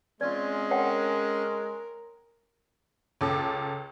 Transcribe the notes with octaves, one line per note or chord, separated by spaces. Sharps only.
G#3 C4 C#4 F4 D5
A#4 C#5 F#5 G5
C#2 C#4 A4 D6